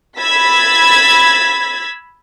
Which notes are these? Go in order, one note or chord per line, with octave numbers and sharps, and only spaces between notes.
B5 E6 G#6 A6 B6